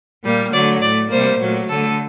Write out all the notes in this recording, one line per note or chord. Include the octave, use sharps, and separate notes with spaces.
A#2 G3 A#3
D3 F#3 A3 D5
A2 A3 D5
C3 G3 A#3 C5
A#2 F#3 A3
D3 A3 A4